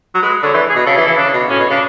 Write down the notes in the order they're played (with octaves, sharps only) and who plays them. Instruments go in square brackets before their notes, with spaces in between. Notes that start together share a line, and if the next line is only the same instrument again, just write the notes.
[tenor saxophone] F#3
[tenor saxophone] G#3 [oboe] B4
[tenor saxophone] D3 [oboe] C#5
[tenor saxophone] E3 [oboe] B4
[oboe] G#4
[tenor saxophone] B2
[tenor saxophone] C#3 [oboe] A4
[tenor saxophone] E3 [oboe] G#4
[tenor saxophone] E3 [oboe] E4
[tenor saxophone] C#3 [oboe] D4
[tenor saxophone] B2
[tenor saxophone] A2 [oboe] C#4
[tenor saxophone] B2
[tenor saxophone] C#3 [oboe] D4